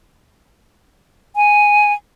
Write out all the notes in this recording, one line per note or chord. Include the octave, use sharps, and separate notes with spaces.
G#5